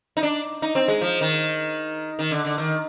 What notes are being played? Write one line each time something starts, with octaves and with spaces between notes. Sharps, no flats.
D#4
D4
D#4
C4
G#3
F3
D#3
D#3
D3
D3
D#3